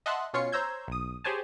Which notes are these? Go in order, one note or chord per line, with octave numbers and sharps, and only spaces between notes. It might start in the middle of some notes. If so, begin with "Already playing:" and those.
D#5 E5 F#5 A5 C6 F#6
B2 C#4 F4 C#5 C7 C#7
C5 C#5 A#5 E6 G6 G#6
B1 D#6
G4 G#4 C5 C#5 G#5 A5